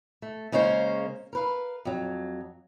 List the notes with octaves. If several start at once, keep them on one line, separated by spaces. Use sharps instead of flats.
A3
C#3 G#3 A#3 C#4 E4 C5
A#4 B4 F5
F2 F#3